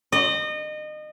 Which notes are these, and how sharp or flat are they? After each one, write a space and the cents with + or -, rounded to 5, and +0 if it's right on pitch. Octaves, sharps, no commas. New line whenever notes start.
D#5 -30